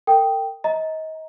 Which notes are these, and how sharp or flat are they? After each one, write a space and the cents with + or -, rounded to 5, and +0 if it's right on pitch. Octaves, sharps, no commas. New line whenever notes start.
A#4 -45 G5 +0
D#5 +30 A#5 +0